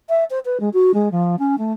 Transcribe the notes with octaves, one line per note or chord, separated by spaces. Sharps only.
E5
C5
B4
G#3
F#4
G#3
F3
C#4
A3